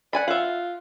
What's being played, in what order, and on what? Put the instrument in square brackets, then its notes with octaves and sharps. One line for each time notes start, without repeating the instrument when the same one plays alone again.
[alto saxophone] D5 [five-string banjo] F#5 G#5 B5
[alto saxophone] F4 [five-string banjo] E5 F#5